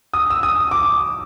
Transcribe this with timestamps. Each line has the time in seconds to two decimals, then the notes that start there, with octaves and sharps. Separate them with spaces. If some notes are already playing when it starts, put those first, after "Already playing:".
0.14 D#6
0.30 E6
0.43 D#6
0.71 D6